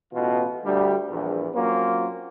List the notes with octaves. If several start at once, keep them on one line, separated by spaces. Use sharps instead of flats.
A1 B2 E3 F4
D2 G3
A#1 E2
F#3 A#3 C4 C#4 F4